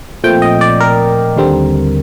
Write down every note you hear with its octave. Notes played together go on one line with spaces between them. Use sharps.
A#2 F3 A3 C4 G5
D#5
D5
A#4
D#2 D3 G3 C4